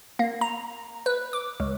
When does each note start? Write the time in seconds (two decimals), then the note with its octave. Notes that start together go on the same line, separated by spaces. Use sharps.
0.19 A#3
0.41 A#5
1.06 B4
1.33 D6
1.60 C#2